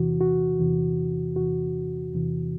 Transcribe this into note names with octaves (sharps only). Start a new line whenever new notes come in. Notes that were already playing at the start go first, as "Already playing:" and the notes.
Already playing: E2 C3 E3 F#4
F#4
E2 C3 E3
E2 C3 E3 F#4
E2 C3 E3